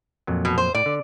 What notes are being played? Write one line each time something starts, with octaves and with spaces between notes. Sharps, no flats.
F2 A#2 F#3
B2
C5
A2 D5
D3